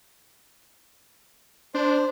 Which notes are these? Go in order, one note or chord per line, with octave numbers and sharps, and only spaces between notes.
D4 C5